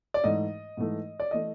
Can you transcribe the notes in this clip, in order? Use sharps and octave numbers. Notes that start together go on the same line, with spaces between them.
D5
G#2 E3 A3 D#5
G#2 E3 A3
D5
E3 A3 D#5